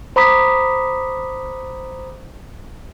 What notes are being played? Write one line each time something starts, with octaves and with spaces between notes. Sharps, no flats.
C5 A#5 B5 D6 D#6 B6